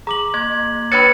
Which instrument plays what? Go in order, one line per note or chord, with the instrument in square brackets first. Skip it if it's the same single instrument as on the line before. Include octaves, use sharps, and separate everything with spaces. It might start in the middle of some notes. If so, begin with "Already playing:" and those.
[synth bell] G#4 [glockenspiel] A#5 D6 F#7
[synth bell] A#3 [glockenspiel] G#6
[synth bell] D4 B4 C#5 [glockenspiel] B5 G#6 A6 [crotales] C#7